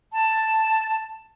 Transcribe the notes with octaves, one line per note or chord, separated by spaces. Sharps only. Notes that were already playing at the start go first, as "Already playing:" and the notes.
A5